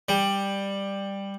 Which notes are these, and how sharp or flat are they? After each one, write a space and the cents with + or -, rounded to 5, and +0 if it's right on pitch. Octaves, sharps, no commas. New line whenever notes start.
G3 +10